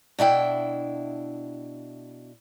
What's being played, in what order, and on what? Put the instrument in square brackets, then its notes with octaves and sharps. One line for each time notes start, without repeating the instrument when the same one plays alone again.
[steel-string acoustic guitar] B2 D4 E4 G5